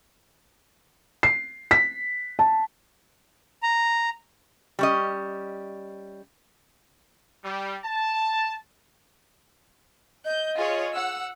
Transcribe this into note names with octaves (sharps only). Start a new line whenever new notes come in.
C7
B6
A5
A#5
G3 C#4 D#5
G3
A5
D#5 G6
F4 G#4 C#5
F#5 E6